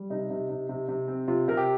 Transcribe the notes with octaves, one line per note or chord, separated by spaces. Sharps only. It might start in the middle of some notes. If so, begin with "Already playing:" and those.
Already playing: G3
C3 D#4
C3
C3
C3
C3
C4
C3 F4
C3 A#4
G4